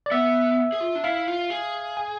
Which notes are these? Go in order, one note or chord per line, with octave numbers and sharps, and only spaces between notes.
D5
B3 E5
G#4
F4
D4
E4 F5
F4
G#4
G#5